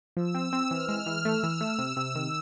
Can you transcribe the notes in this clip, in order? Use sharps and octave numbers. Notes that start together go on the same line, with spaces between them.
F3 E6
C4
C4
E3 F6
G#3
E3
A3 E6
E3
A3
C3
C3
D#3